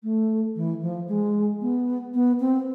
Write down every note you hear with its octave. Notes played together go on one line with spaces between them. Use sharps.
A3
E3
F3
G#3
B3
B3
C4